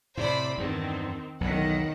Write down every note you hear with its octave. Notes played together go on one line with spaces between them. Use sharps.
A2 C3 C5 D5 B5
E2 G2 D#3 C4
B1 E2 D#3 F#5